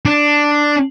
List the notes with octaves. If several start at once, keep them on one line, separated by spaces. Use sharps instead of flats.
D4